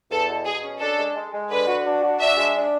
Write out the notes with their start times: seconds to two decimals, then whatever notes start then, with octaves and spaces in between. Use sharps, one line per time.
0.10 E2 A4
0.28 B2
0.45 B2 G#4
0.63 C#4
0.80 D4 A4
0.97 G#3
1.16 G#3
1.33 G#3
1.50 D3 B4
1.67 F#4
1.86 D4
2.03 F#4
2.20 D4 E5
2.37 G#3
2.55 D4